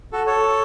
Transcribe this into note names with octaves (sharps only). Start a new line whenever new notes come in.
F#4 A4
A4 C#5